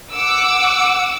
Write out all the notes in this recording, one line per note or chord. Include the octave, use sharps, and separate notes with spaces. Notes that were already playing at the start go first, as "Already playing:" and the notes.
F#5 D6 E6